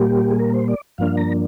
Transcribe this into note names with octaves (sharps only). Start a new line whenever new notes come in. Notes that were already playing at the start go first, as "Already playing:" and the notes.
Already playing: A#2 G3 A#3 G4
G#4
A#4
C5
D5
G2 F3 A#3 D4 F5
A#5